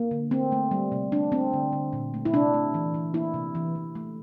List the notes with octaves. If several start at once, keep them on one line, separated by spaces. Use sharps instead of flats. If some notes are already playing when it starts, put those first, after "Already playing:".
Already playing: A#3
D3
A3 C4
A3
G3
C3
A3 D4
A3 C4
D3
D3
A#2
A3
E4
C3 D4
A3
E3
E3
A#3 E4
C3
E3
E3
A3